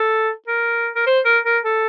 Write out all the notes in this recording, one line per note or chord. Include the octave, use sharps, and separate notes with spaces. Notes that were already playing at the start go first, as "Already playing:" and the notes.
Already playing: A4
A#4
A#4
C5
A#4
A#4
A4